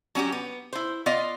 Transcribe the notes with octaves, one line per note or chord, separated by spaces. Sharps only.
F#3 C#4 F#4 G4
B3
E4 C5
B3 F4 D5 D#5 F5